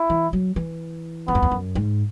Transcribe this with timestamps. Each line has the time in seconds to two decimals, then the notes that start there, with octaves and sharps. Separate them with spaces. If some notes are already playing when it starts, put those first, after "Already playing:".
Already playing: E4
0.10 E3
0.33 F#3
0.56 E3
1.28 E2 B3
1.35 F#2
1.42 E2
1.51 F#2
1.75 G#2